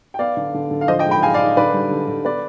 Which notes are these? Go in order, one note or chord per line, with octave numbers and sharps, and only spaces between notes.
G5
B3 D5 F5
D3
D3
D3
F5
F3 C5 D#5
D#5 G5
G#3
G5 B5
G#3 F5 G#5
D5 F5
D#4
D3 B4 D5
G3
D3
D3
B3 B4 D5